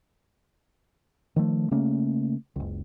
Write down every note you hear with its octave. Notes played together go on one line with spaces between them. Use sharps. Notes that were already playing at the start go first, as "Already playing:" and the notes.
D#3 F3 A3
C#3 A3 A#3 C#4
F#1 C#2